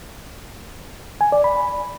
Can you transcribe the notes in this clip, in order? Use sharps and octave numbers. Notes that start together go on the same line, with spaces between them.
G#5
D5
B5